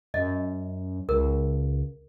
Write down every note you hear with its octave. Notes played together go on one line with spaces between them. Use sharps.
F#2 D#5
C#2 A#4